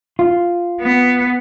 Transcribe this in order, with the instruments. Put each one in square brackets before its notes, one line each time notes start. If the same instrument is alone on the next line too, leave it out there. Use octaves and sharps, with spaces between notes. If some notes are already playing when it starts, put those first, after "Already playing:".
[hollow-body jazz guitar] F4
[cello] B3